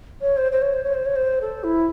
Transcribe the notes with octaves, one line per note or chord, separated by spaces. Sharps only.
C#5
C5
C5
C#5
C5
C#5
C5
C#5
C5
A4
E4